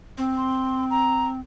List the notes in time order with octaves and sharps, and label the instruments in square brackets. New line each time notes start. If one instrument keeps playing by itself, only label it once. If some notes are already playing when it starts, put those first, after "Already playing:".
[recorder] C4
[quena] C6
A#5